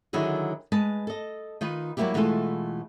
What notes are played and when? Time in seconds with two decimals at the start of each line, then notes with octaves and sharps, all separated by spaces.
0.13 D3 D#3 F#3 E4 F#4 G#4
0.72 G#3 B4 A5
1.07 A4 D#5
1.61 D#3 D#4 F4 B4
1.97 F#3 G3 A3 A#3 E4 G4
2.14 B2 E3 G#3 A3 F4 A4